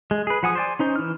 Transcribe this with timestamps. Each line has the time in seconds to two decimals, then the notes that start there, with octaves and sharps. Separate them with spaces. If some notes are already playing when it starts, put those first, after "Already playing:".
0.11 G#3
0.27 G#4 B4
0.43 F3 F#5 G#5 D#6
0.55 C5 D5 G#5
0.79 C#4 D#4 C5
0.96 E3 F6